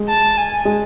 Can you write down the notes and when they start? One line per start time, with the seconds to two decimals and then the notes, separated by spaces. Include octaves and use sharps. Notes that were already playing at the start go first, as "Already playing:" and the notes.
Already playing: G#3
0.08 A5
0.37 G#5
0.65 G#3